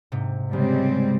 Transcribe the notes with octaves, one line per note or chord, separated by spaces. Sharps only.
G#2 C3
C#3 G3 G#3 C4